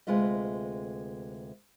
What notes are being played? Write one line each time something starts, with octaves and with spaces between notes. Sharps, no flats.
D2 C3 G#3 F4 B4 D#5